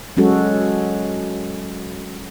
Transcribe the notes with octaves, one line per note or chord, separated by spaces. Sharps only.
F#3 G#3 C#4 F#4 A4